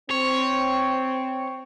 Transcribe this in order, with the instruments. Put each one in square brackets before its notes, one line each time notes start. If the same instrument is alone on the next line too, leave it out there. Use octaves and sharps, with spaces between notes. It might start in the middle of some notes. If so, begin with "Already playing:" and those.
[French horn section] C4 [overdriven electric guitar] C#5